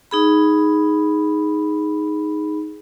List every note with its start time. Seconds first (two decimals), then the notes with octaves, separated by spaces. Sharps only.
0.11 D#4 G#4 B5